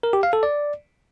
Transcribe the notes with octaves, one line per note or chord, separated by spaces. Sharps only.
A#4
G4
F5
A4
D5